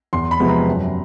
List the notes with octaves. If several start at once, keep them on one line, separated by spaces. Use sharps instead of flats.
E2 C6
B5
C3 F3 G#3 B3
A#5
F#2